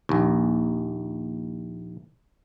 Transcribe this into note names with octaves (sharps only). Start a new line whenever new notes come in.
A#1 D#2